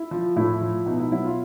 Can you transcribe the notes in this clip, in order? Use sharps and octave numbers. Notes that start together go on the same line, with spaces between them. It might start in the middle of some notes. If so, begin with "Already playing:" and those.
Already playing: E4
F3
A2 E4
F3
B2 D#4
E4
F#3 E4
F4